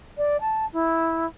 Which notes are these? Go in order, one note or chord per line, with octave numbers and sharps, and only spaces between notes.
D5
A5
E4